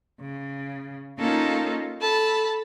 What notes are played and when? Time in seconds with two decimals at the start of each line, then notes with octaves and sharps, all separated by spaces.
0.20 C#3
1.17 A#3 C#4 D#4 F4 A4 A#4
2.01 A4 A5 B5